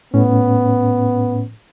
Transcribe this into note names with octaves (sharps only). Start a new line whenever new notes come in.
A2 B3 C#4